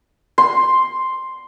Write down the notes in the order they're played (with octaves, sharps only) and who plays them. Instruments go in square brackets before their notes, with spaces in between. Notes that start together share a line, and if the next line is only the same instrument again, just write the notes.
[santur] C6